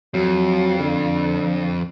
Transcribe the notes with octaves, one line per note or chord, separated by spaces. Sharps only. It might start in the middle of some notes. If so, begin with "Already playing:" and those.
F2 F#3
D3